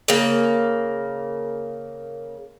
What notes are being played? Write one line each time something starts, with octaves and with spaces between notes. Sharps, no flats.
C#3 A#3